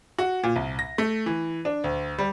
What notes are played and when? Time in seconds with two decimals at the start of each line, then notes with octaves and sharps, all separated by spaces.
0.18 F#4
0.43 A#2
0.56 C2
0.79 A#6
0.98 A3
1.26 E3
1.65 D4
1.84 D2
2.19 G3